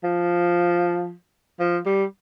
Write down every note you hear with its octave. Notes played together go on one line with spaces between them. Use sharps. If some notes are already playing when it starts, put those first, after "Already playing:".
F3
F3
G3